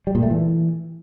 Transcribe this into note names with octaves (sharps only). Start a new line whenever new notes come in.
G3
A#2
A3
E3